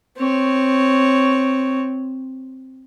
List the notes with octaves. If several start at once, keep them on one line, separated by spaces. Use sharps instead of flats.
C4 C#5